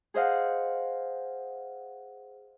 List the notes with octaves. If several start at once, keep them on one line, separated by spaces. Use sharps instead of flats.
G#4 C5 D#5 F5 F#5